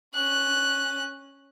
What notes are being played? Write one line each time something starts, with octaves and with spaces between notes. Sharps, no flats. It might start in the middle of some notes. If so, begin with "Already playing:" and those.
C#4 F#6